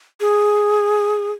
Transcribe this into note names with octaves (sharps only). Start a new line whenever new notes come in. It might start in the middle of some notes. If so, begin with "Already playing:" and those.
G#4